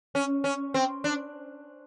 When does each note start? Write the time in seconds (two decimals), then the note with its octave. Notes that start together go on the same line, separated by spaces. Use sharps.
0.15 C#4
0.44 C#4
0.74 C4
1.04 D4